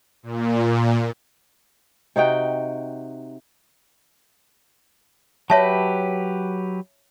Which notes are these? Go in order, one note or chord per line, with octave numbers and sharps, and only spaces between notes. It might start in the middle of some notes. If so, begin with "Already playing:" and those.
A#2
C3 D#4 F#4 G5
F#3 G4 B4 C#5 E5 A5